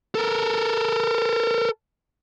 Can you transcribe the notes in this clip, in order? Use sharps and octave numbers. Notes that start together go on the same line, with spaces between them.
A4 A#4